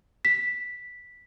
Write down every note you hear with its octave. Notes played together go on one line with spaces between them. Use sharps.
B6